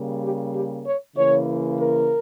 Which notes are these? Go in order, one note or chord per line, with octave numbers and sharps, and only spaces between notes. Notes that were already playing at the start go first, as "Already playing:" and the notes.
Already playing: C#3 G3 A#3
G4
G4
C#5
C#3 E3 A#3 C#5
A#4